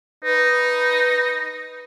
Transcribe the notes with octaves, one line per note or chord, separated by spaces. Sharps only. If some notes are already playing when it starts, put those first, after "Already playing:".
D#4 B4